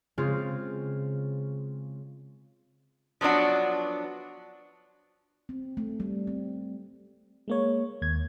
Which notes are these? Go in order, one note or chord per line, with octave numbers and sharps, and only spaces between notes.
C#3 G#3 C4 F4
F3 F#3 B3 D4 F#4
C4
A3
G3
C4
G#3 A#3 C#5
D#2 G#6